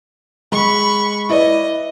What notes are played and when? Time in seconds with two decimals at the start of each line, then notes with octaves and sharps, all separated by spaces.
0.52 G#3 B5 C#6
1.29 E4 B4 D5 D#5